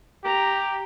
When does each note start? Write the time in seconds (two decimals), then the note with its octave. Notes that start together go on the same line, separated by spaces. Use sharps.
0.25 G4 A#5